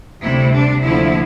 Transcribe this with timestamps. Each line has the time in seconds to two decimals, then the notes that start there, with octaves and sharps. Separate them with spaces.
0.22 D2 C3 G3 E4
0.53 D4
0.83 D2 D3 F3 A#3 E4